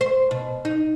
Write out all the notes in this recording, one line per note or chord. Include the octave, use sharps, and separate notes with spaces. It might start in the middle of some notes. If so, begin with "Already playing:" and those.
C5
B2
D#4